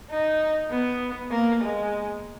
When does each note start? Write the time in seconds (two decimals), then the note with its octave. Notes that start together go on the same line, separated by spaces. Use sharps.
0.10 D#4
0.71 B3
1.31 A#3
1.61 G#3